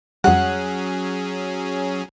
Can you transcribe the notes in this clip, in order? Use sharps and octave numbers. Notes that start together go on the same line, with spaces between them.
F2 F#3 G3 C#4 G#4 F#5